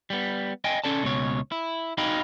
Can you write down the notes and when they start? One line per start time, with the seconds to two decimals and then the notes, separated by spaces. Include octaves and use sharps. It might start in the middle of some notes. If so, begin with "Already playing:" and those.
0.10 G3 B3
0.64 D#5 G5 G#5
0.84 C#4 A4 D5 A5
1.03 C#2 B2 C#5
1.52 E4
1.98 D#4 F#4 D#5 F5 G5 B5